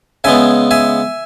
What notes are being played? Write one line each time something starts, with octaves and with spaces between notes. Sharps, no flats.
C#3 G#3 B3 E5 G#5
E5 G#5